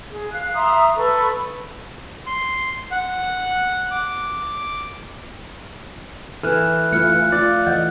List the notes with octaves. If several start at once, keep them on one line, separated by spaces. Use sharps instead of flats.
G#4
F5 F#6
E5 A#5 C6 D#6
A4 B4 C#6
C6
F#5
D6
E3 A4 B4 F6 F#6
A3 F4 F6 F#6 C#7
F4 D5
E3 D#5 F#5 G6